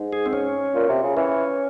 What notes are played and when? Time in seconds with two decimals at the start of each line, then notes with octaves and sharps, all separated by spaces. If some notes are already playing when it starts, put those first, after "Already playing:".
Already playing: G#2
0.13 G#4
0.26 C4
0.33 C#4
0.75 A#2
0.89 C3
1.03 C#3
1.16 E3 C#4